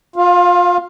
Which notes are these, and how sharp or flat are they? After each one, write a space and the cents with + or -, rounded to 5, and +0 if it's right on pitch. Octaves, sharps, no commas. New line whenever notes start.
F4 +25 F5 +0